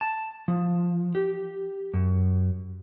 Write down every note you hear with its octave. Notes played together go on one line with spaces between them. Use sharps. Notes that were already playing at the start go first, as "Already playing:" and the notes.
A5
F3
G4
F#2